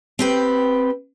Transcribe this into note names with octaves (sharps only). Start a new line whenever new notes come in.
C4 G4 B4